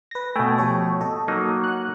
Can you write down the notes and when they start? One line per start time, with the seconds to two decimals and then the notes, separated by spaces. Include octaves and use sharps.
0.11 B4 A#6
0.36 B2 A3 G5 G#5
0.58 F3 G4 C#5
1.00 A4 D#5
1.28 F#3 A#3 D#4
1.64 F#5 F#6